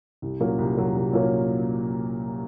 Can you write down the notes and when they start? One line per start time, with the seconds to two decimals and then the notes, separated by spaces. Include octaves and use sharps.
0.22 C2
0.40 A#2 F#3 A#3 C#4
0.59 C2
0.77 A#2 F#3 A#3 C#4
0.95 C2
1.13 A#2 F#3 A#3 C#4